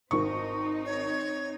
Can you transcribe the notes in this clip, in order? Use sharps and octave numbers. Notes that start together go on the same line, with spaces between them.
G#1 D#3 C4 D#4 C#6
C#5